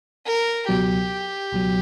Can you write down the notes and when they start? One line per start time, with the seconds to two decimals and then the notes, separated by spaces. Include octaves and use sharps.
0.26 A#4
0.68 C#2 B2 F#3 G4
1.52 C#2 B2 F#3